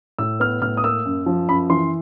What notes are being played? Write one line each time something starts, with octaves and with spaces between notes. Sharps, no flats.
A2 E6
B3 F6
A2 F6
D#6
A#3 E6
F#2
F3
F#2 B5
E3 C6